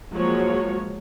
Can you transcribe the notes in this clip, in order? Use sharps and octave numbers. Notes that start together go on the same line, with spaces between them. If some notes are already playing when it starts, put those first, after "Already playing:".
F3 F#3 G#3 A#3 F#4 C#5